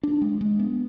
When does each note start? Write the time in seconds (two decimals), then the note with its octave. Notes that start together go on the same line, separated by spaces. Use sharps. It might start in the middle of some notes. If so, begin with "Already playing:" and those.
0.03 D4
0.22 G#3
0.41 G#3
0.59 B3